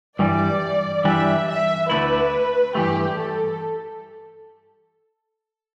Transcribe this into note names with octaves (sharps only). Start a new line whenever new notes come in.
G2 E3 G3 D5
G2 E3 G3 D4 E5
E5
D2 D3 A3 E4 B4
G2 E3 A3 G4
A4